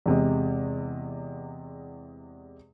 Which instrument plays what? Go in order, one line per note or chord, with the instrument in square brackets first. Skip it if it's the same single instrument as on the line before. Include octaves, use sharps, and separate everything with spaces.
[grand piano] E2 C3 G#3